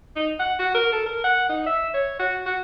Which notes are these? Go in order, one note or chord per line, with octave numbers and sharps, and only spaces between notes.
D#4
F#5
F#4
A#4
A4
A#4
F#5
D#4
E5
C#5
F#4
F#4